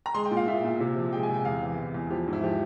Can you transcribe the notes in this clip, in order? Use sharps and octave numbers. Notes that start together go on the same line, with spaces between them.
A#5
G#3 C6
G5
A#2
F5
A#2 E5
A#2
C3
F3
G#3 G5
G#5
C3 G5
E2 F5
E3
E2
E2
F3 G4
G#2
E4
F3 G4